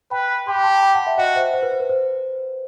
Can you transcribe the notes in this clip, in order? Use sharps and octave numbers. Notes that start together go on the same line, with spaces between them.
B4 G5 B5
G4 C6
B5
A5 C6
G5 B5
F#5 A5
E5 G5
F#4 D#5 F#5
C5 E5
C5
B4
C5
B4
C5